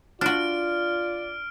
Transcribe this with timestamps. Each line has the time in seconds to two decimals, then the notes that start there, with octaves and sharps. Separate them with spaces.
0.21 D4 F4 F#4 D5 F6 D7